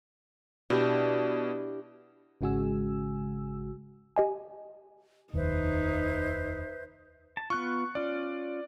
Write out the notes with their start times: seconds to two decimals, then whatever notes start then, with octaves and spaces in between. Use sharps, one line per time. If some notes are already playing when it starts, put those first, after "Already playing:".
0.70 B2 D4 E4 G4
2.41 G#1 C#3 G#3 F#4 G#5 E6
4.16 G4 D#5 G#5
5.33 F1 D#2 D#4 B4 C5 E5
7.37 A5
7.50 B3 F4 C#6 F#6
7.95 C#4 F4 D5